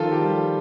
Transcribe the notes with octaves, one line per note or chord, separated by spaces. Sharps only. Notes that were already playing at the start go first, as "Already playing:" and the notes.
Already playing: D#3 F3 F4 A4
G4
G3